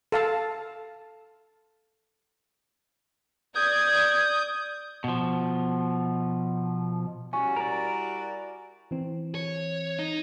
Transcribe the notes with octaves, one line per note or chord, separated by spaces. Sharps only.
A4 F5 A5
D5 D#6 G6 G#6
B2 F3
G3 C#4 E4 F#4 G#5 C#6
A#4 D5
E3 C4
C#5
D#4